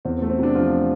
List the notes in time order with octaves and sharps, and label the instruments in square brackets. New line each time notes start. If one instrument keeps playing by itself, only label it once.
[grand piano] E2 C4
C4
A3
C4
C3 D4
F3 F4